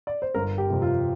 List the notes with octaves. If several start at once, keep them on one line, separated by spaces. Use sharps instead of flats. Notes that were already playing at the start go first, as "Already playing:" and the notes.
D5
C5
G1 A#4
G4
F2 C3
F4